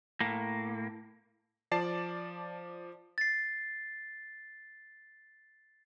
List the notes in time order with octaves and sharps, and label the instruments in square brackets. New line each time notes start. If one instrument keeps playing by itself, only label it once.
[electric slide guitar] A2 A#3
[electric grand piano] F3 D5 A5 C7
[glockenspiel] A6 C7